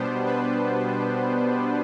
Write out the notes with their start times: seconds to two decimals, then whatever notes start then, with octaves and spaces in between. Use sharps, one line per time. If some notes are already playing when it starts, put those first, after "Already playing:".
Already playing: B2 G3 B3 D4 C5
0.26 B4